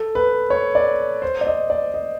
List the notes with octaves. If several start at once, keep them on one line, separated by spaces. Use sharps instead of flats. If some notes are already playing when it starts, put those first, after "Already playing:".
Already playing: A4
B4
C#5
D5
C5
D5
D#5
D5
D#5